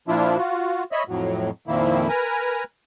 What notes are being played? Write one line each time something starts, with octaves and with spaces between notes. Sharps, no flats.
A#2 F3 D4 E4 F4
F4 F#4
C#5 D#5 E5 B5
F2 A2 F#3
F2 A#2 D#3 F3 A#3 E4
A#4 B4 G#5 A#5